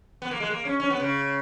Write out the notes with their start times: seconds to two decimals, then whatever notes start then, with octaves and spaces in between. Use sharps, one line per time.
0.22 B3
0.31 A#3
0.40 G#3
0.50 A#3
0.65 C#4
0.80 C#4
0.90 B3
1.00 C#3